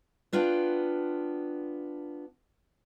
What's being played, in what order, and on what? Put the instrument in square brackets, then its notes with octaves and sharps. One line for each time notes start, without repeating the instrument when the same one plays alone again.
[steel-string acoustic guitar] B3 D4 F4 G5